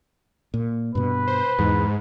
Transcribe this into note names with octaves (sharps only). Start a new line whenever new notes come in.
A#2
G2 B2 B4
C5
E2 G#2